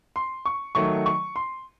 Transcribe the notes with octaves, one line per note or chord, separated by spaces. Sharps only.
C6
C#6
D#3 F#3 A3 C#6
C#6
C6